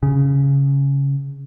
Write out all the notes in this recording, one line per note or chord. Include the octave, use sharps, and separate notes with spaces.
C#3